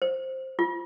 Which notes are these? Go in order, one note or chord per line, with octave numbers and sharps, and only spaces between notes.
C5
F4